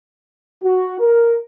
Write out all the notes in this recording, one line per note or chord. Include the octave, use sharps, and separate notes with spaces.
F#4
A#4